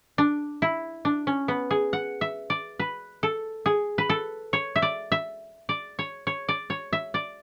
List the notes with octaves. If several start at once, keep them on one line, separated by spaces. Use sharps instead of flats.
D4
E4
D4
C#4
B3
G#4
F#5
E5
D5
B4
A4
G#4
B4
A4
C#5
E5
D5
E5
D5
C#5
C#5
D5
C#5
E5
D5